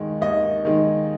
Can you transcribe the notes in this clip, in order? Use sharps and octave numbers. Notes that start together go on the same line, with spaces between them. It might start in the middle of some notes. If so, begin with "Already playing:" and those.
Already playing: D#2 D#3 G#3
D#2 D#5
D#3 G#3